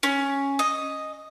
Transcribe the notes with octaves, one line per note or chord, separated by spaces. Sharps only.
C#4
D#5